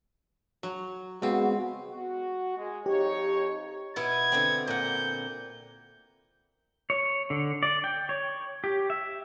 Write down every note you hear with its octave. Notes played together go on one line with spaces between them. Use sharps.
F#3
C#3 G#3 B3 C4 F#4
F#4
G#3
F2 D#4 G4 C#5
B2 B3 E4 G#6
D3 B3 C4
A#2 F#5 G6
C#5
D3
D5
G5
C#5
G4
E5